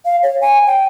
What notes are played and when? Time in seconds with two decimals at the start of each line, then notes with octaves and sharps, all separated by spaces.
0.05 F5
0.23 C#5
0.41 G#5
0.67 G5